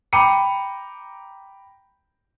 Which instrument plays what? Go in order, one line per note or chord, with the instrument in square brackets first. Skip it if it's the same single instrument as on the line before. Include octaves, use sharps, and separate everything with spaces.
[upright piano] G5 A#5 B5 D6 C#7 D#7